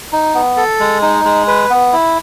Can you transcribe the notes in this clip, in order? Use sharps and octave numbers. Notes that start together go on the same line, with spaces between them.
D#4
B3
A4
G#3
D#4
G#3
B4
B3
E4